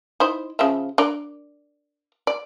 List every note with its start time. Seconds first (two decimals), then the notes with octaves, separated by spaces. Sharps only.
0.20 D#4 E4 C5
0.59 C#3 F3 E5
0.98 D4 A#4 D5
2.27 D5